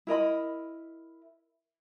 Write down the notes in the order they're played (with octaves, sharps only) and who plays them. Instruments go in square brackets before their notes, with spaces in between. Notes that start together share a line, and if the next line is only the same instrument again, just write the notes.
[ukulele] E4 A#4 D#5 B5